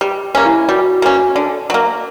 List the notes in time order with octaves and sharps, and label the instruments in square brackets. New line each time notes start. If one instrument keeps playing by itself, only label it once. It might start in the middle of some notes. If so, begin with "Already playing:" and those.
[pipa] G3 [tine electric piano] G4
[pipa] A#3 C#4
[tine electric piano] E4
[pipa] G3 [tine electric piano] F#4
[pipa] A#3 C#4
[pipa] D3 [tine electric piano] D5
[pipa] F#3 A#3